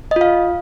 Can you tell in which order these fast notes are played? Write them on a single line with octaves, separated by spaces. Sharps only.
D#5 F4 F5